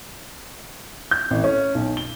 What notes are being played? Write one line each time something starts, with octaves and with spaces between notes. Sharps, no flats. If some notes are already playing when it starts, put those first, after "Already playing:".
G6
A1
C#4
B1
G7